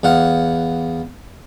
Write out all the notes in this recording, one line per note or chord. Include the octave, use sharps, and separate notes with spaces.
E2 F5 F#5